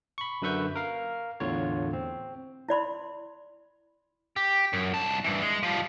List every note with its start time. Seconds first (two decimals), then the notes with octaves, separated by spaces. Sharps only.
0.18 B5 C#6
0.42 F#2 D3 B4 E5 C#6 G6
0.76 A#4 F5
1.40 E2 A2 D3 F4 C#5
1.93 C4
2.69 E4 D5 B5 C6
4.36 G4
4.73 F#2
4.94 C2 A5
5.24 G2 E3
5.42 G#3
5.63 F3 G3